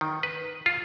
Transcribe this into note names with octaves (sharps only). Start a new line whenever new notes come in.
D#3
B4
F4